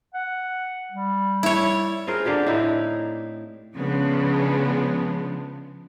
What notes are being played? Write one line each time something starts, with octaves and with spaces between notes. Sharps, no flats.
F#5
G3
E4 C#5
C4 F4 G#4 A#4
D3 A#3 G4 G#4
A2 D#4 E4
C#3 F3 G#3 B3 D4